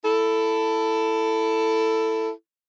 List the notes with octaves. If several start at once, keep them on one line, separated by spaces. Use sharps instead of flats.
E4 A4